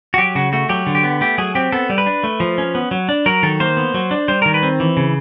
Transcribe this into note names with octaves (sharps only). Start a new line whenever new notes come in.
F#4
F#3 G4
C#3 F#4
A3 F#4
F#3 G4
D3
G4
B3
A3 G4
F#3 G#4
C4 G4
B3 A4
G3
B4
D4
A3
F3
C#4
B3
F#3
D4
F#3 A#4
D#3 A4
A#3 C5
B3
F#3
D4
G3 C5
D#3 A#4
B4
C4
E3
C#3